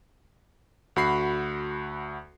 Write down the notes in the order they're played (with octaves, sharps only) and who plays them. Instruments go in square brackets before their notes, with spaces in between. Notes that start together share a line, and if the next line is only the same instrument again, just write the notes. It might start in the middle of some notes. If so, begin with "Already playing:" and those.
[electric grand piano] D2 F#4 B5 C7